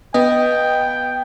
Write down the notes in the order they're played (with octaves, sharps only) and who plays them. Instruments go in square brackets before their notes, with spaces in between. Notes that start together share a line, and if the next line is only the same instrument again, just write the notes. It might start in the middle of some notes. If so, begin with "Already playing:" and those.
[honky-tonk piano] B3 [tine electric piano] D#5 [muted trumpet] G5